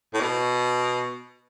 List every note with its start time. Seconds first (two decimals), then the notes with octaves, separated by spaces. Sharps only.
0.14 A2
0.21 B2